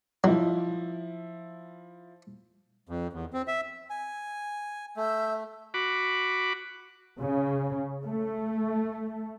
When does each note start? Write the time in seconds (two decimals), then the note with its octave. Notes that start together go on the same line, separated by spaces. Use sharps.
0.24 F3 F#3 E4
2.89 F2
3.13 E2
3.33 C4
3.48 E5
3.90 G#5
4.97 A3 E5 E6 G6
5.74 F#4 B5 D6
7.19 C#3
8.04 A3